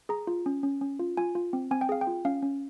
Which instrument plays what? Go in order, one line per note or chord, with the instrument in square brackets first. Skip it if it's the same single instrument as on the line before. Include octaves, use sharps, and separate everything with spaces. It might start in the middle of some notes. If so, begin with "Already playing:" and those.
[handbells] G#4 A#5
F4
C#4
C#4
C#4
F4
F4 G#5
F4
C4
C4 G#5
G5
G#4 F5
G5
F4
C#4 F5
C#4